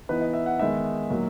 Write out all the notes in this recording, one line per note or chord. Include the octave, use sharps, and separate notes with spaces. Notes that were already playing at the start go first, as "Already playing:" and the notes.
E3 B3 D#4 B4
D#5
E5
F#5
D#3 G#3 B3 D#4 E5
A#2 F#3 A#3 D#4